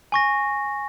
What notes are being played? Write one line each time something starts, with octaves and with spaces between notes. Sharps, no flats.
G#5 C#6 A#6